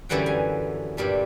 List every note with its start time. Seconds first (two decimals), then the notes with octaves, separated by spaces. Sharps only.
0.09 F#2 D3 E3 G3 F#5 G5
0.26 G#5
0.97 G2 A#2 G3 A3